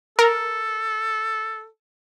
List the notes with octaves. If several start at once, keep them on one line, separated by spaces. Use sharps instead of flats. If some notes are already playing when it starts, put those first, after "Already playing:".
A4 A#4